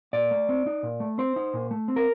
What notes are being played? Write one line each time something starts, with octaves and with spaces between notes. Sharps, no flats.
A#2 D5
A3
C4
D#4
A#2
A3
C4 C5
D#4
A#2
A3
C4
A#4